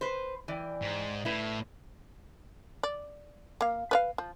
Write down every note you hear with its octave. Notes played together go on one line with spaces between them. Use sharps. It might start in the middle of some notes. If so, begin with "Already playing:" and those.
B4 C5
E3 D5 G5
G#2
A2 E4 B4
D5
A#3 F5
B4 C#5 F5
F3